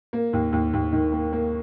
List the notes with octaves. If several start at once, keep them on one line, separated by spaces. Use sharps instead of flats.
A#3
D#2
D#2
D#2
D#3
A#3
A#3